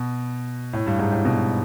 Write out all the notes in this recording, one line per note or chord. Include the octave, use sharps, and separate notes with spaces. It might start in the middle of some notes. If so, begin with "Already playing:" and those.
Already playing: B2
A2
G2
G#2
A2
B2